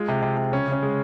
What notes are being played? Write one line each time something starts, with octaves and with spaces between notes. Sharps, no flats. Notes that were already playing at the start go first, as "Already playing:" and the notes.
Already playing: G#3 F4
C3
C3
C3
C#3 C#4
C#3 C#4
G#3